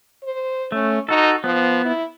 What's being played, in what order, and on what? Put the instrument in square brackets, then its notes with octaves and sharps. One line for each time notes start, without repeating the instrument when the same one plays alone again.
[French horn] C5
[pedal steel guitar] A3 [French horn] C#4
[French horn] D#4 [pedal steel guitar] F#4 A4
[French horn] F3 [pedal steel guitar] B3
[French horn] E4